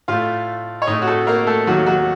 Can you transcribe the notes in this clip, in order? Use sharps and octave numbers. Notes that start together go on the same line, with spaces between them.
A2 A3 F4 F5
C#5
A2 A3 D#4 D#5
F#4
A3 A4
A#3 A#4
A3 A4
D#2 D#3 F#3 A3 F#4
F#3 F#4